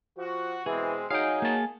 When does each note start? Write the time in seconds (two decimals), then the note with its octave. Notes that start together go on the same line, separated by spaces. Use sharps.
0.17 F3 F#4
0.66 B2 E3 G#3 C4 G#4
1.11 F#3 D#4 G#4 F5 G5
1.42 A#3 A5